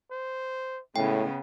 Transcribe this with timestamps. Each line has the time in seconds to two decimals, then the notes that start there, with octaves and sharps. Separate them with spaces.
0.11 C5
0.96 A2 C#3 G#3 B3 G5